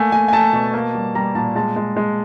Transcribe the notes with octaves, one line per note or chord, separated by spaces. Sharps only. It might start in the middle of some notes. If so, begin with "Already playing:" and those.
Already playing: A3 A#3 G#5
A3 G#5
G#5
A3 A5
B2
A#3
G3
G3 A#5
A#2 A5
G#3 A5
G#3
G#3